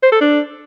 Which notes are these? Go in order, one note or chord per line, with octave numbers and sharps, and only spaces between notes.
C5
A4
D4